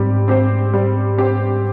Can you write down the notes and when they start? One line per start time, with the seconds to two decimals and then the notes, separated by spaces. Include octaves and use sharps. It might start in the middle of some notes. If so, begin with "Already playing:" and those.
Already playing: G#2 G3 C4 G4
0.28 C4 G4 C5
0.74 G3
1.18 C4 G4 C5